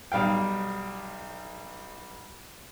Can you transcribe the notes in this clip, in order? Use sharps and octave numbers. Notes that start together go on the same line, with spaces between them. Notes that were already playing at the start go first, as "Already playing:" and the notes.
B1 G3 F5 G5